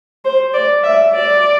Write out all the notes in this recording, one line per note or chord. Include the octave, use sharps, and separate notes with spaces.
C5
D5
E5
D5